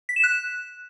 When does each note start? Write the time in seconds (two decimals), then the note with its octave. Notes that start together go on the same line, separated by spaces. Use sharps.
0.09 B6
0.16 E7
0.23 F#6